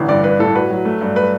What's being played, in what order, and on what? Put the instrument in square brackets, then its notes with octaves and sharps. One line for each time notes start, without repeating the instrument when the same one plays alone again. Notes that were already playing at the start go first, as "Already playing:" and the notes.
Already playing: [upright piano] A1 D3
[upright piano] G2 [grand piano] D5
[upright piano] D4 [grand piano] B4
[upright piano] A2 [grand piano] A4
[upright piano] F#4 [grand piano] B4
[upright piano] F#3
A3
G2
[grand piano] B4